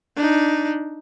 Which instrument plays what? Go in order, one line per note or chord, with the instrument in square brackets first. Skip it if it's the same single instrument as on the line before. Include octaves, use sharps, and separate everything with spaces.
[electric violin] D4 D#4